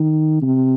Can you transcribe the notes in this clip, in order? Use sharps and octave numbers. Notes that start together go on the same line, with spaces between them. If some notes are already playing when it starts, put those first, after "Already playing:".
Already playing: D#3
C3